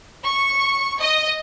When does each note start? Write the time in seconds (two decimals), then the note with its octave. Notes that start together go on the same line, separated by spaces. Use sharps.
0.25 C#6
1.00 D#5